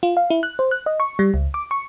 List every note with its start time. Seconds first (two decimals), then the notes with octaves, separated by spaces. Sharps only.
0.03 F4
0.17 F5
0.30 E4
0.43 F#6
0.59 C5
0.71 F#6
0.86 D#5
1.00 C#6
1.19 G3
1.34 C#2
1.54 D6
1.71 C#6